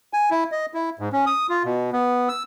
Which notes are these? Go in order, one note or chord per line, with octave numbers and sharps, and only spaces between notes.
G#5
E4
D#5
E4
G#2
C#4
D#6
F4
B2
B3
E6